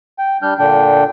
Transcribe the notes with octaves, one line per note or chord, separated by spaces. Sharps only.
G5
G3 D4 F6 G6
A#2 D3 D4 G5